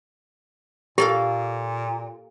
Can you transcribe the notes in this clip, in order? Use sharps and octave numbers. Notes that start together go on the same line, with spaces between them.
A#2 A#3 G4 A4 F5